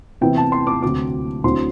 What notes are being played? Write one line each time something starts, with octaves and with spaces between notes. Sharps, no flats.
C3 E3 B3 E4 G5
A5
C6
D6
D2 C3 F#3 D6
D2 D3 F#3 C4 E4 C6